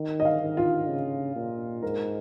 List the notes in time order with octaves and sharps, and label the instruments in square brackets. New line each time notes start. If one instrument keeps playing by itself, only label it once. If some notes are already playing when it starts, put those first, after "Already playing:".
Already playing: [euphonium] D#3
[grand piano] D#5
F5
[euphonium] D#3
[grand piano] F4
[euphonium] C#3
A#2
[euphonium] G#2 [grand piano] A#4